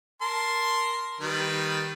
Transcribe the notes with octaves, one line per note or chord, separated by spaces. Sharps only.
A#4 A5 C6
D#3 G3 B4